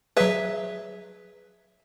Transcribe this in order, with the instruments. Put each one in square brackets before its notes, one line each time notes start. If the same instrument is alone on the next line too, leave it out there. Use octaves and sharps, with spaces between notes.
[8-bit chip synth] F#3 B4 [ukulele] G#4 E5